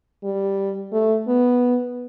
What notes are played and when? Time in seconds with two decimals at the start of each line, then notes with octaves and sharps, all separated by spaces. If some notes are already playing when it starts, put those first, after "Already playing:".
0.23 G3
0.93 A3
1.28 B3